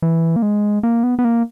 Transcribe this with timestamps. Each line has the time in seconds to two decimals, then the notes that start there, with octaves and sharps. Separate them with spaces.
0.02 E3
0.36 A#3
0.42 G#3
0.83 A#3
1.03 B3
1.19 B3
1.24 A#3